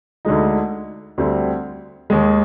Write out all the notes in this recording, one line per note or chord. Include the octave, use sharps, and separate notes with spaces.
D2 D3 G#3 D#4
D2 D3 G3 C4
D#2 D#3 G#3